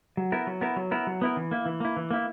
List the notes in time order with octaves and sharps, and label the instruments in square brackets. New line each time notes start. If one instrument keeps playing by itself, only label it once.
[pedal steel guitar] F#3
B3 E4 A#4
F#3
B3 E4 A#4
F#3
B3 E4 A#4
F#3
B3 E4 A#4
E3
A#3 E4
E3
A#3 E4
E3
A#3 E4